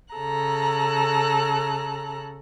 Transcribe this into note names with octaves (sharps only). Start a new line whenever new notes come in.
C#3 A4 A#5 F#6